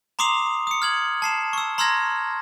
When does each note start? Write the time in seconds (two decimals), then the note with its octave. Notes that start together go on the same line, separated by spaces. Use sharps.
0.19 A#5 C6 D6 D#6 C7 F7
0.67 D#6 C#7
0.82 F6 G#6 F#7
1.22 A5 C7 E7
1.53 C#6 E6
1.78 A#5 C6 E6 F6 G#6 A#6